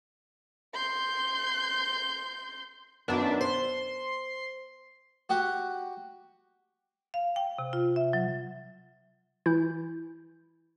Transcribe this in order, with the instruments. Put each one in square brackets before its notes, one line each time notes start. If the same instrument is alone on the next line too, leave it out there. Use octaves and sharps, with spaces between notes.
[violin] C6 G6
[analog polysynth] F#2 D4 E5 [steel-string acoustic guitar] D#3 B3
[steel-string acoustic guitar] C5 [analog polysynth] C6
[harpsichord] F#4 G4 F#5
[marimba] F5
G5
C3
F4
E5
F#3
[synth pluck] E3 E4 G6